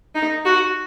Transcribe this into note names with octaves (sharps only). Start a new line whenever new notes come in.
D#4
F#4